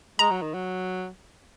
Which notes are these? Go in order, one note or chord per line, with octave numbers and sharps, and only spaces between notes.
G#3 A#5
F#3
D#3
F#3